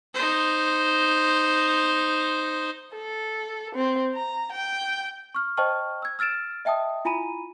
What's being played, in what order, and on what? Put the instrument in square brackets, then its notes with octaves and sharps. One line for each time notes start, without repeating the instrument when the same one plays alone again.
[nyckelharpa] D#4 C5
[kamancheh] A4
C4
A#5
G5
[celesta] C#6 F6
C5 D#5 G5 A5 C#6 F6
E6 G#6
E6 F6 A6 D7 E7
D#5 E5 G5 A5 D#6
E4 F4 G#5 A#5 B5 D#7